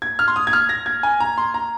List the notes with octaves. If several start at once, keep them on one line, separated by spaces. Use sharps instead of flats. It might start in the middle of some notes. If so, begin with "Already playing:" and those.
G#6
F6
C6
D#6
G#6
F6
A#6
G#6
G#5
A#5
C6
A#5